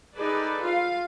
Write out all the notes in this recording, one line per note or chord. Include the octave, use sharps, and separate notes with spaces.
D#4 G#4 A4 B4 D5
F4 F5